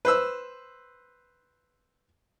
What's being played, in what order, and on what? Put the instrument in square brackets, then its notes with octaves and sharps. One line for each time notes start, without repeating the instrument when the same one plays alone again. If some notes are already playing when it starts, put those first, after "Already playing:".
[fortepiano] B4 C5 E6